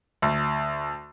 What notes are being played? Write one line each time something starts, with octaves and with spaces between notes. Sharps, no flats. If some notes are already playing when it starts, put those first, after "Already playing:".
D2